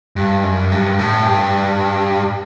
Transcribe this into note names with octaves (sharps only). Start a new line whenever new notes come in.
G2
F#2
G2
A2
G2